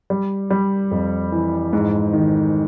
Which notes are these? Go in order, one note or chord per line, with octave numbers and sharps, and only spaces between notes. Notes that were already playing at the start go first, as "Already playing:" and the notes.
G3
G3
F2
E3
G#2
D#3